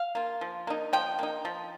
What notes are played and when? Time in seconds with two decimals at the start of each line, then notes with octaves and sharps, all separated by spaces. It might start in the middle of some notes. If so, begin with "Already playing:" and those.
Already playing: F5
0.15 A#3 F4
0.41 F3
0.67 A#3 D#4
0.93 F3 G5
1.19 A#3 D#4
1.45 F3